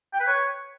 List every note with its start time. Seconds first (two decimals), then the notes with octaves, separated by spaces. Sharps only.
0.13 G5
0.20 B4
0.27 C#5